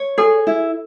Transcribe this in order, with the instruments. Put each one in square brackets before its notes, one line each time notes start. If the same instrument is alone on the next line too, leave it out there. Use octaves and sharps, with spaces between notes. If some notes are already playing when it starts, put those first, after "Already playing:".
Already playing: [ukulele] C#5
[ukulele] G#4 [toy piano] A4
[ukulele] E4